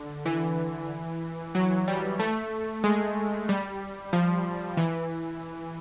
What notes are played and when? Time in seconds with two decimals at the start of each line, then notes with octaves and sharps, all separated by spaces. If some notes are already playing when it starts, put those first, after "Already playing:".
Already playing: D3
0.26 E3
1.55 F#3
1.88 G3
2.20 A3
2.84 G#3
3.49 G3
4.13 F3
4.77 E3